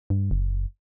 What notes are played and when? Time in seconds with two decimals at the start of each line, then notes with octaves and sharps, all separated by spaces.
0.10 G2
0.31 F#1